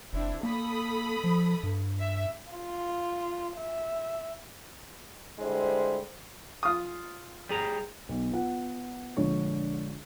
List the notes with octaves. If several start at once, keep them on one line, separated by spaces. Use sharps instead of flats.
F#1 C4 D4 E4
A#3 A4 B5 D#6
F3
G2
E5
F4
E5
D3 G3 G#3 E4 C5
F4 D#6
G3 G#4 A#5
B1
B3 F4 F#5
A#1 D3 G#3 F4 C#5 C#6